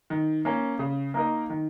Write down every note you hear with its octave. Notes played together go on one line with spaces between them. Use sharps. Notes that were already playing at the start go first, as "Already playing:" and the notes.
D#3
A#3 C#4
C#3
A#3 D#4 A#4 D#5
D#3